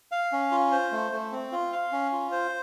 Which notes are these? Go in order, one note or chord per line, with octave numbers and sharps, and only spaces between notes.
F5
C#4
F4
C5
A3
A3
C4
F4
F5
C#4
F4
C5